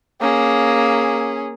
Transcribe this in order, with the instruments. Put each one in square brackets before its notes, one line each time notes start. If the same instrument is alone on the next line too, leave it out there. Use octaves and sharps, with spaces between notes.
[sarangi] A#3 [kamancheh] C#4 G#4